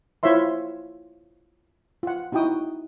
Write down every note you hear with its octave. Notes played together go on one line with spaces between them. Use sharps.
E4 F4 C5 C#5 E5 C6
F4 F#5
D#4 E4 F#4 G5 D#6